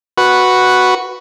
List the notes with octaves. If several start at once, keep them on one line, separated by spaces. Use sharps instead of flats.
F#4 B4